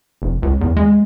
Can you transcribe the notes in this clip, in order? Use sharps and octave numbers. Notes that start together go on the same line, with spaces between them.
F1
C#2
E2
G#3